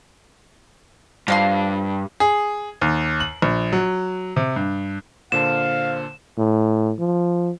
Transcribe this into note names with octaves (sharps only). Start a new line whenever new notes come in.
G2 F3 F5 C6
G#4
D#2
F#7
A#1
F#3
C3
G2
A#2 D3 C5 F5 A5 E7
A2
F3